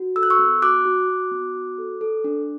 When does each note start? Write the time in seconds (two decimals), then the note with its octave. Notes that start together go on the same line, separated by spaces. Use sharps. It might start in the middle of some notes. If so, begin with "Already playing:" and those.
Already playing: F#4
0.16 A4 E6
0.23 F#6
0.30 C#6 E6
0.39 B3
0.62 F#4 D6 F#6
0.85 F#4
1.08 F#4
1.31 B3
1.55 F#4
1.78 A4
2.01 A4
2.24 D4